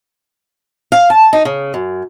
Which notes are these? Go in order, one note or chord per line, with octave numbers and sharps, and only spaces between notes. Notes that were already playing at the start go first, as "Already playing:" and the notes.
F5
A5
D#4
C#3
F#2